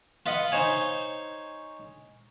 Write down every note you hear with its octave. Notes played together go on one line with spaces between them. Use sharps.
F4 B4 D#5 F#5
D#4 C5 C#5 G#5